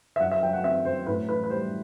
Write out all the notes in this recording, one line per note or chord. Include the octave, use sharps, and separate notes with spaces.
E5
F#2 F#5
E5
F#3 G5
F#5
C4 E5
F#2 C5
A2 B4
E3 B4
B4
G3 C5